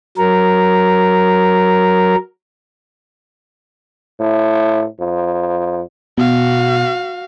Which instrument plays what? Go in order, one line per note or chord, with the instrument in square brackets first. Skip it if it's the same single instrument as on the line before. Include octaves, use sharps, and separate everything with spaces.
[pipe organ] F#3 A#4
[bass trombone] A2
F2
[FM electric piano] B2 [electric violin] F#4 F5